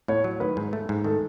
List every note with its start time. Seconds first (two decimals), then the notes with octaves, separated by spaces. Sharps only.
0.08 A2 C#5
0.24 F#3
0.40 D#3 B4
0.57 G#2
0.73 A3
0.89 G#2
1.04 D#3 A4